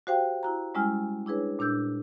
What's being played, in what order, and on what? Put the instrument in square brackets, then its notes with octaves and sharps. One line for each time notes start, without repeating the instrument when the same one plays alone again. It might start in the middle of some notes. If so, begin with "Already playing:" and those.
[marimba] F#4 G4 C5 F5 G5
E4 F#4 A#5
G3 G#3 C#4 E4 G#5 F6
D4 E4 G#4 B4 C#5
A#2 D4 E6 G6